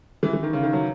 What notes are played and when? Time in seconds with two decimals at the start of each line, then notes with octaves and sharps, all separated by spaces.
0.23 E3
0.33 E3
0.43 D#3
0.53 C#3
0.63 D#3
0.73 F#3